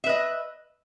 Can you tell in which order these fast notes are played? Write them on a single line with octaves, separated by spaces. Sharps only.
E5 B4 D#5